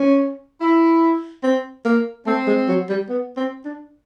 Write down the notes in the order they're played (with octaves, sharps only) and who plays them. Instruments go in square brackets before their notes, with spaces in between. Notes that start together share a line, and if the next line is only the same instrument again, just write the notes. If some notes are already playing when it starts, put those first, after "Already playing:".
Already playing: [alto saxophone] C#4
[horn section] E4
[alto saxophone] C4
A#3
[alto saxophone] A3 [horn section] C4
[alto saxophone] G#3
F#3
G3
B3
C4
D4